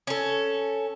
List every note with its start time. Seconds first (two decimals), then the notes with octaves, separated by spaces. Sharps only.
0.07 C#4 A4